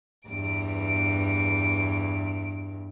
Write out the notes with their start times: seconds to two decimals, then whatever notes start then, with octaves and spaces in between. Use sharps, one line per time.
0.28 E2 G2 D7